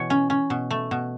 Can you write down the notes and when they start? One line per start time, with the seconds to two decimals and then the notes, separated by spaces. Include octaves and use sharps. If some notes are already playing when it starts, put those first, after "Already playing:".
Already playing: B2 E3 C#5
0.10 C#4
0.30 C#4
0.50 B2
0.71 A3
0.91 B2